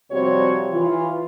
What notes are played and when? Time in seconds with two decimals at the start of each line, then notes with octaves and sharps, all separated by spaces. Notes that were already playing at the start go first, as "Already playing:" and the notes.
0.11 C3 F3 G3 C4 F#4 C#5
0.70 E3 F4